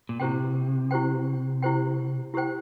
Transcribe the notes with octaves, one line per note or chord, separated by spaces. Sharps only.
A#2
C3 E4 G4 C5 G5
E4 G4 C5 G5
E4 G4 C5 G5
E4 G4 C5 G5